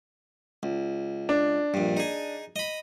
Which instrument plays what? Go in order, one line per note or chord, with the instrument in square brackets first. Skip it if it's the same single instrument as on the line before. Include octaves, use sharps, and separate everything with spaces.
[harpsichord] C#2
[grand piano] D4
[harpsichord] A#1 G2
D#4 G#4
D#5 B5